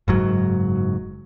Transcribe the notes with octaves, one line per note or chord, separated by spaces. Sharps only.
F#1 G#2 F#3